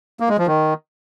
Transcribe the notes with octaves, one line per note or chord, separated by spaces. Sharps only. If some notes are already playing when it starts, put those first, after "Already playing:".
A#3
G#3
F3
D#3